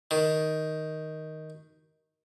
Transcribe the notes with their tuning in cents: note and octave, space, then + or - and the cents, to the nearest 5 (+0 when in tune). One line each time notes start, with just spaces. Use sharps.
D#3 +5